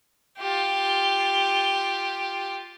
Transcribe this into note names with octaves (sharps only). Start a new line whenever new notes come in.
F4 G4